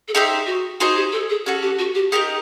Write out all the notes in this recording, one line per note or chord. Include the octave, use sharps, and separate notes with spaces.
A4
D#4 G4 G#4 C5 E5
F#4
D#4 F#4 G#4 C5 D#5
G4
A4
G#4
C#4 F#4 G4 A4
G4
F#4
G4
D#4 G4 G#4 A#4 D#5